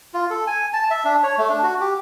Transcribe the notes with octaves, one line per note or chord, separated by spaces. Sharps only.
F4
A4
G#5
A5
E5
D4
C#5
A3
D4
F#4
G4